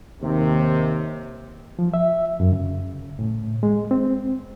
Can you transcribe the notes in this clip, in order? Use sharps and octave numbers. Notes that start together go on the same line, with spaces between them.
D#2 C3
F3
E5
F#2
C#3
A2
G#3
C4